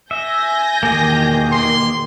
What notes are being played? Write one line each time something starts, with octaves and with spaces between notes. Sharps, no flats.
E5 G#5 G6 A#6
E2 B2 D#3 A#3 G4 G#4
C6